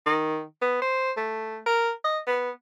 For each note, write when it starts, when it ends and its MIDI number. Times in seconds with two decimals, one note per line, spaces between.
0.06 0.42 51
0.62 0.78 59
0.82 1.12 72
1.17 1.58 57
1.66 1.91 70
2.04 2.18 75
2.27 2.50 59